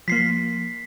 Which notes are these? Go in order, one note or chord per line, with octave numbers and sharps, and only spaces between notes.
F3 A#3 B6 C7